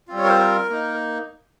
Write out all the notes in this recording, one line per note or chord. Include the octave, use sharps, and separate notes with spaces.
G3 C4 F4
C#5
A#4
C5
A#4
A#3 D#4